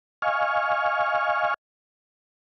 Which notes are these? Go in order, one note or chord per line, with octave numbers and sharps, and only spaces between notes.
D#5 F5 G#5 C#6 F6